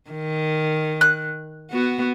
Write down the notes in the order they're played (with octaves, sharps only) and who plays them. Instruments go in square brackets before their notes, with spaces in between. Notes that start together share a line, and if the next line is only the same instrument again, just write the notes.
[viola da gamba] D#3
[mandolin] F#6
[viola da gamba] B3 F#4